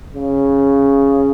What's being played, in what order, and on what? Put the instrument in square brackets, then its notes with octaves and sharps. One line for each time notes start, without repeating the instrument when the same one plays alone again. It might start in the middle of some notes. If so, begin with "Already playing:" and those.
[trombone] C#3